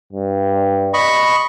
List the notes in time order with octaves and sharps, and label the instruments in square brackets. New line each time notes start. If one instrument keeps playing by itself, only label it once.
[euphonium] G2
[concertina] D#5 B5 C#6